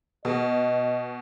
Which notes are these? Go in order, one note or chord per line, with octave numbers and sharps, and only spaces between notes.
B2 D#5